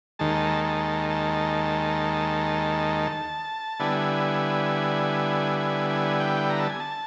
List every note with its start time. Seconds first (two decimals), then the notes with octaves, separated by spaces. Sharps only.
0.19 D#2 D#3 G#3 A5
0.65 A5
1.10 A5
3.80 D3 G3 B3 E4 G#5
5.60 G#5
5.90 G#5
6.20 G5
6.50 A#5
6.60 A5
6.70 G#5
6.80 A5